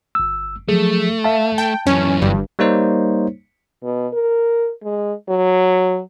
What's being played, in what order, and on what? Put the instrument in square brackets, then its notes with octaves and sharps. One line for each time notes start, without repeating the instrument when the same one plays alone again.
[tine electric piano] G1 E6
[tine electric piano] F3 F#3 G#4 [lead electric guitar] A3
[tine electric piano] E5 F5 A5
[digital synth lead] G5 [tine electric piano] A5
[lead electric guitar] F#2 E3 [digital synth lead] C#4
[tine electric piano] G1 [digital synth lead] G2
[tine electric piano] G3 A#3 D#4 C5 C#5
[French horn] B2
A#4
G#3
F#3